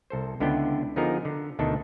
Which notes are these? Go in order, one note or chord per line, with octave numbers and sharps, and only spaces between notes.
C2 A4 C5
C#2 D3 B3 D4 E4 G5
D3 F3 B3 D#4 G#4 A#4
D3
D2 B2 D#3 D4 D#4 A4